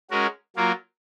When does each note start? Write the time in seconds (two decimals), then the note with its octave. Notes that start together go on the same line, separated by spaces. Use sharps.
0.10 G#3 C#4 F#4 A#4
0.56 F#3 A#3 F4 A#4